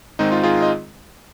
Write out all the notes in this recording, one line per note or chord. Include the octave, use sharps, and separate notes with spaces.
G#2 D#3 G#3 C4 D#4
F4
F4 G#4
D#5